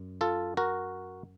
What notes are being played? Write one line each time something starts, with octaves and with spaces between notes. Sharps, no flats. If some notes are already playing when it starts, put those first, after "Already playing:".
Already playing: F#2
F4 A4
F#4 A#4